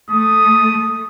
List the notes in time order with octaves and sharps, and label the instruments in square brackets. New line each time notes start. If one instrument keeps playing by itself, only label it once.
[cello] A3 [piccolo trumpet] D#6